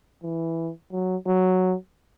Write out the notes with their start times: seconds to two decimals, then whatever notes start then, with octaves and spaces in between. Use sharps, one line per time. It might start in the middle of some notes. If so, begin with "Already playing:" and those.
0.23 E3
0.92 F#3
1.27 F#3